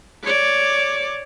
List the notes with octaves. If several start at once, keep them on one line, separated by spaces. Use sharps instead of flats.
C#5 D5